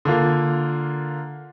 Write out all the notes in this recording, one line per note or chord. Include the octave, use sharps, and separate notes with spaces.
D3 A#3 F4